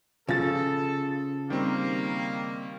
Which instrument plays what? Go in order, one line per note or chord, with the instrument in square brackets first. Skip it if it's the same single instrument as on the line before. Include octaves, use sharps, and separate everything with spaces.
[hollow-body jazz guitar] C#3 [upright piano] F3 A6 [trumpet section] A4
[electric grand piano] D#3 G3 C4 [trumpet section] A#3